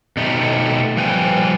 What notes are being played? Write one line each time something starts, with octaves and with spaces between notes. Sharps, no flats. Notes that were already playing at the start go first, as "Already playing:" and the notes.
B2 A3 D#4 G4
F3 G3 B4 G5 G#5